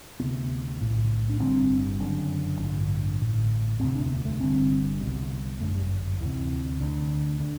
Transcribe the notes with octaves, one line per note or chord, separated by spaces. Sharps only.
D2 C3 B3
B1 A2
D4
G1 G2 D3 C4
F#1 F#2 D3
A1 G2 D3 D4
A1 A2
E1 D2 C3 C4
D4
B3
A3
G1 G2 D3 C4
C2 B2
G1 F#2 D3 A3
G3
D2 C3 E3
D2 D3
D3